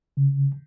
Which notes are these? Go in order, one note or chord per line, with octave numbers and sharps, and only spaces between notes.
C#3